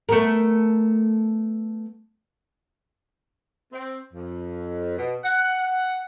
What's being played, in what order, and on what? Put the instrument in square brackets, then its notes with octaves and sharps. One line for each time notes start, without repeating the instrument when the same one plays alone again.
[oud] A3 B3 A#4
[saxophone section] C4
F2
B2
F#5